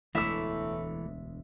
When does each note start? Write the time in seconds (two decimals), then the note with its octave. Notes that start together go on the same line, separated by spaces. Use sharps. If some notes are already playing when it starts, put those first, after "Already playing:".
0.15 E1 D2 A2 E3 G#3 A3 E5 E6